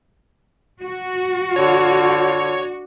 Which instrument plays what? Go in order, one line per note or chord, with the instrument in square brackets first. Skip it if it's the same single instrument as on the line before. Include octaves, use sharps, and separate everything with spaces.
[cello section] F#4
[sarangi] D3 [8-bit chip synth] C#5